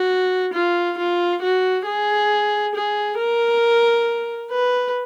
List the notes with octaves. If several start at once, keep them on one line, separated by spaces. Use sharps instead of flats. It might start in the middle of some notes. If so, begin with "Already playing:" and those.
Already playing: F#4
F4
F4
F#4
G#4
G#4
A#4
B4